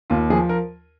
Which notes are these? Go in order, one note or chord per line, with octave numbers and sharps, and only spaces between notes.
D#2 F4
F3 G#4
A#4